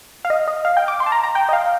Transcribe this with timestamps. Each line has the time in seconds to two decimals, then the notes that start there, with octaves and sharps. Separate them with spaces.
0.25 F5
0.30 D#5
0.48 D#5
0.65 F5
0.77 G5
0.88 D6
1.00 C6
1.06 A5
1.12 A#5
1.24 A#5
1.35 G5
1.49 D#5
1.53 F5